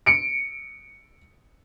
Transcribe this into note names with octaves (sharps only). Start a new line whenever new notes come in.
C#7 D7